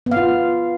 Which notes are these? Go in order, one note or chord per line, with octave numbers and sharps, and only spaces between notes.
B3
F5
F4